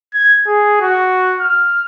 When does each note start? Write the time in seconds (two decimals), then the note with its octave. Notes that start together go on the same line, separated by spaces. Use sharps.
0.14 G#6
0.47 G#4
0.81 F#4
1.41 F6